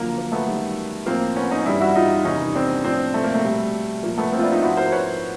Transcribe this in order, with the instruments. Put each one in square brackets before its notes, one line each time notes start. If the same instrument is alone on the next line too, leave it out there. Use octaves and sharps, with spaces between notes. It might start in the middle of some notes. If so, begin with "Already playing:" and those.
Already playing: [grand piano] F#2 D3 F3 A#3
A#3
A3 B3
F#2 D#3 G3
A2 F3 A#3 C4
B3 C#4
C#4 D#4
G2 E3 G3 D4 E4
E4 F#4
D#4 F4
E2 C3 D#3 G3 C#4 D#4
C4 D4
A2 F3 C4 D4
A3
A#3
A3
B2 G3
A#2 F3 A#3
A3 B3
A#3 C4
F4
D4 E4
D#4 F4
G#2 F3 E4 F#4
A#4 C5
B4 C#5